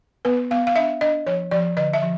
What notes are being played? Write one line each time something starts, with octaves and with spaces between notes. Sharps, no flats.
B3 B4
B3 F5
F5
D4 E5
D4 D#5
F3 C#5
F3 D5
D3 D#5
E5
F3